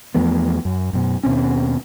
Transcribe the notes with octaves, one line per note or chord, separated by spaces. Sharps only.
E2 F3 A3 B3
F#2
F#2 B2
D#2 B2 C4 C#4